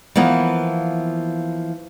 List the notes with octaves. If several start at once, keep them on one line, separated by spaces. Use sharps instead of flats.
E3 F3 A#3 B3